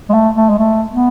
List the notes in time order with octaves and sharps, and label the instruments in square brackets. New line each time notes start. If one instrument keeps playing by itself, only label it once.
[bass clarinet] G#3
A3
A3
G#3
A3
B3